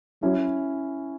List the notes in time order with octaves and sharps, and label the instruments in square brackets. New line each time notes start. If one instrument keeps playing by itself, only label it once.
[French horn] F#3 [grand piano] C#4 E4